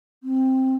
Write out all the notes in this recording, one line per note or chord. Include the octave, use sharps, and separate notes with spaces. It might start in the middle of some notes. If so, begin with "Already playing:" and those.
C4